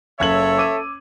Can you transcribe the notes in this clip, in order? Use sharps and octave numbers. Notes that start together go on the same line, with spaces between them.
F#1 A4 C#5 E5 G#6 F#7
D6 E6 D#7